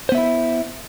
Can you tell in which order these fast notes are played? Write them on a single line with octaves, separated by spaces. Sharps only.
C5 B3 E5 E4